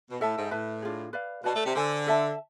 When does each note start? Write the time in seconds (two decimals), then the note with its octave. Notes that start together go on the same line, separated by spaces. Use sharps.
0.10 B2
0.20 A2 A4 E5 A5
0.36 G#2
0.51 A2 B4 E5 A5
0.82 D4 F4 G#4
1.13 B4 D5 F5
1.44 B2 B4 D5 A5
1.55 A3
1.65 C3
1.75 D3 A4 C5 G#5
2.07 A4 E5 A5